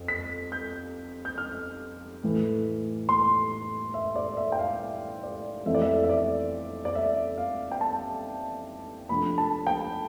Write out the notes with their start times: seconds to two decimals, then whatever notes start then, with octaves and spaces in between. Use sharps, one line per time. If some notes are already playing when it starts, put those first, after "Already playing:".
Already playing: F2
0.08 B6
0.52 G6
1.25 G6
1.38 F6
2.23 A2 E3 A3
3.09 C6
3.94 E5
4.16 D5
4.37 E5
4.52 G5
4.59 F5
4.73 F5
4.80 E5
5.23 D5
5.66 F2 E3 A3 E5
5.75 D5
5.82 E5
6.04 E5
6.09 D5
6.85 D5
6.95 E5
7.38 F5
7.71 G5
7.81 A5
9.09 C3 F3 A3 D4 B5
9.38 A5
9.67 G5